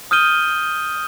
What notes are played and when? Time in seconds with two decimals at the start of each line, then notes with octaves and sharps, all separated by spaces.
0.11 D#6 F6 G6 D#7 G7